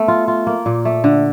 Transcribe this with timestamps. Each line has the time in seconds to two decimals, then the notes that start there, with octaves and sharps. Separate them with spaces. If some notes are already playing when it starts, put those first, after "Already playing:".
Already playing: A3 B3
0.08 F4
0.28 F4
0.47 A#3
0.66 A#2
0.85 A3
1.04 D3